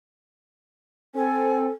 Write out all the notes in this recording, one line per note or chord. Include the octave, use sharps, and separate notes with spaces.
C4 A4 G#5